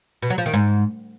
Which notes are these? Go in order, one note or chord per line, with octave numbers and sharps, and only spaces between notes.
B2
F#3
F3
D#3
G#2